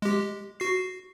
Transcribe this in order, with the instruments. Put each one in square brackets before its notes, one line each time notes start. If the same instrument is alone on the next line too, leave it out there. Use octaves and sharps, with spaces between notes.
[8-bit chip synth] G#3 G4
F#4 C7